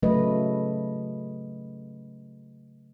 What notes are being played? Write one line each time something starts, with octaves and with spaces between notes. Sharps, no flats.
C#3 F#3 A3 B4 D#5